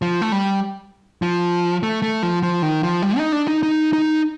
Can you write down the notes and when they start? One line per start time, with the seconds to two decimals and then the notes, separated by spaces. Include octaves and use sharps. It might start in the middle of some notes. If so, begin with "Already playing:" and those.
0.02 F3
0.21 A3
0.32 G3
1.22 F3
1.83 A3
2.02 A3
2.23 F3
2.43 F3
2.62 D#3
2.83 F3
3.02 G3
3.18 D#4
3.32 D4
3.48 D#4
3.63 D#4
3.93 D#4